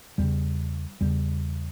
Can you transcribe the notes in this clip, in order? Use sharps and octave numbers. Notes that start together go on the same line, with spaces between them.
E2 C#3 G3
E2 C#3 G3